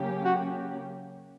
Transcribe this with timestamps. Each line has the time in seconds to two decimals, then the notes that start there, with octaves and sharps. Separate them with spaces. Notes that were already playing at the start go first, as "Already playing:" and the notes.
Already playing: C#3 F#3 A#3 C#4 G4
0.25 F#4